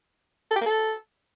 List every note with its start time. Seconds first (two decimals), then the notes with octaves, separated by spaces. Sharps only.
0.51 A4
0.56 G4
0.61 A#3
0.66 A4